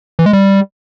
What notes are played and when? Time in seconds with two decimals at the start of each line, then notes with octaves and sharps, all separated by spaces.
0.19 E3
0.26 G#3
0.33 G3